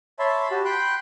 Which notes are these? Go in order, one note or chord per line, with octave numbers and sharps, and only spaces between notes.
C#5 E5 A5 B5 C6
F#4 G4 A5
G5 B5 C6 F#6 G6